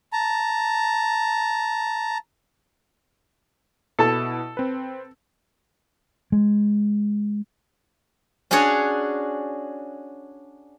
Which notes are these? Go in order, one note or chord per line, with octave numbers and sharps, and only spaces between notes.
A5 A#5
B2 E4 A4 A5
C4 B4
G#3
C#4 D4 F#4 G#4 C#5